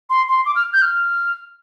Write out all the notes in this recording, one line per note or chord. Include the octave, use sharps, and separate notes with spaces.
C6
C6
D6
F6
G6
F6